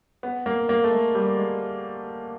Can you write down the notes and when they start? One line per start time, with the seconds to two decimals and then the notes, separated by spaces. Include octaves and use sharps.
0.23 B3
0.46 A#3
0.69 A#3
0.84 A3
0.91 G#3
1.15 G3
1.37 G#3